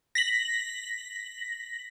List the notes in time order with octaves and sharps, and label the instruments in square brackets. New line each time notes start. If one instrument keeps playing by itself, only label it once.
[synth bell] A#6 B6 F#7